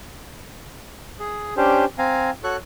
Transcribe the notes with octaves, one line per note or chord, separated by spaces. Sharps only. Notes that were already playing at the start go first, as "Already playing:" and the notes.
G#4
C#4 D4 G4 C5
C4 F5 G#5 A#5
F#4 A4 C#5 C#6 F#6